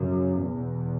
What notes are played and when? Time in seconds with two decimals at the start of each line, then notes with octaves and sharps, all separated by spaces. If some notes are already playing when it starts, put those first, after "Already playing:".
Already playing: F#2 C#3
0.40 E2 B2